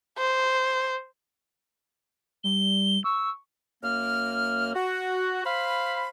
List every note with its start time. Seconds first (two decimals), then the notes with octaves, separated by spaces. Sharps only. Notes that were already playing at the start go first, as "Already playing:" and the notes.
0.18 C5
2.44 G3 G7
3.04 C#6 E6
3.83 F#2 A#3 F6
4.75 F#4
5.45 C5 F5 B5